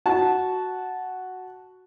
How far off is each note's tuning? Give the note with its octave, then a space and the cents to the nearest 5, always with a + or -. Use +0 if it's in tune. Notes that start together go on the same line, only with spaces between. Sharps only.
F#4 +0 A5 -10